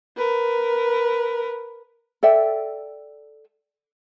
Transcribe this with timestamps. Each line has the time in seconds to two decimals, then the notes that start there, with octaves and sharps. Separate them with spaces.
0.17 A#4 B4
2.23 A4 D5 E5 G5